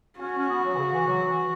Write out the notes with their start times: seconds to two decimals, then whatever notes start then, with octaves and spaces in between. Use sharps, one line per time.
0.19 C#4 F#4
0.39 C#4
0.49 B3
0.64 F#3
0.74 E3
0.78 C#3
0.93 E3
1.08 F#3
1.28 E3